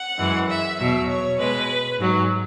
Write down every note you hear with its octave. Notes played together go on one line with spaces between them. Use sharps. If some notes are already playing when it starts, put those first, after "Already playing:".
Already playing: F#5
F#2 E3 G#3
E5
E2 B2 F#3 E5
C#5
B2 G#3 B4
G#2 F#3